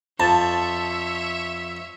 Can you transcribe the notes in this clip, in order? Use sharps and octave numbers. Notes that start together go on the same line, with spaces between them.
F2 C#5 E5 A5